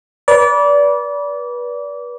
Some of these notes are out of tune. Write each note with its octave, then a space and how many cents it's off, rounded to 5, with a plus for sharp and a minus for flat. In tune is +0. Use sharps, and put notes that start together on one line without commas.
B4 -30 D5 -25